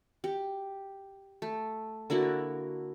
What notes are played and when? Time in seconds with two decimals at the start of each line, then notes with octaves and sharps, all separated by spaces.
0.24 G4
1.42 A3
2.10 D3 A#3 E4 F#4